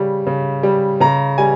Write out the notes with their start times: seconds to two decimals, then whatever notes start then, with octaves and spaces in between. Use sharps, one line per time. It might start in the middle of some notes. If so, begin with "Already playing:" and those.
Already playing: C#3 G3
0.26 C#3
0.63 G3
1.00 C#3 A#5
1.38 G3 G#5